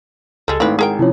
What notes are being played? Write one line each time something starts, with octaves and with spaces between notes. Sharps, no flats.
C#2 G3 G#3 A4
G#1 A3 C4 E4 B4 F5
G#3 E4 G#4 A#4 F#5 G5
C3 F3 C#4 E4 F4 C#5